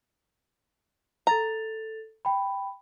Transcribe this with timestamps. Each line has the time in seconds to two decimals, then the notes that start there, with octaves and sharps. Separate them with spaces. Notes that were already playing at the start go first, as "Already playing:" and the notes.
1.27 A4 A#5 A6 F7
2.25 G5 B5